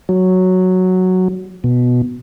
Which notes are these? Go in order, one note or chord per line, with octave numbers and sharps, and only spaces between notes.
F#3
B2